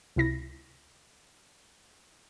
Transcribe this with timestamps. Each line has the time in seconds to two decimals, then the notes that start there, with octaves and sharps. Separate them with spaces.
0.16 C#2 C3 E4 A#6